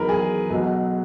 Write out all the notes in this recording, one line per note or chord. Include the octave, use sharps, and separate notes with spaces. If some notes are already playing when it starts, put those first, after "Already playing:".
Already playing: E2 D#3 F#3 A#4 B4
G#4
B1 B2 F#3